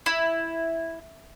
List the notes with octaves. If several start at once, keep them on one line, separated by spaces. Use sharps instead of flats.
E4